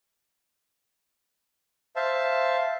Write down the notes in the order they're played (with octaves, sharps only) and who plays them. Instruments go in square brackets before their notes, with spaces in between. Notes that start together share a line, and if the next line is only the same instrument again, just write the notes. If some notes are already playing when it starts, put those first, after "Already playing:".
[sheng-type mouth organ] C5 E5 F5 A5